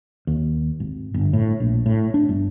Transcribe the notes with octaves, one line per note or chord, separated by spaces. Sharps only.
D#2
G#1
G1
A2
A#1
A2
D4
G1